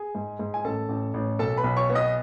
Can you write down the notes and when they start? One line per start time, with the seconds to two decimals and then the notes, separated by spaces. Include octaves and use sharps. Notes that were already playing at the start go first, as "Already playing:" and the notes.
Already playing: G#4 G#5
0.15 G#2
0.39 G#2
0.54 G#5
0.64 A1 A4 A5
0.89 A1
1.14 A1
1.39 B1 A4 A5
1.57 B4 B5
1.64 B1
1.76 C#5 C#6
1.89 B3
1.95 D#5 D#6